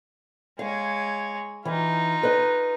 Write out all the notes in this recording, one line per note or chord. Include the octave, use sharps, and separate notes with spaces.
G#3 C#5 F5
E3 D#4 F4
B4 D#5